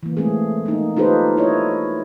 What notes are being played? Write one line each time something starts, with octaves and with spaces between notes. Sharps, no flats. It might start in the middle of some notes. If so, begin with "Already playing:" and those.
E3 A#3
G#3 A3 C4 G#4
A#3 D#4
D#4 F4 G4 A4 B4 C5
E4 C#5 D#5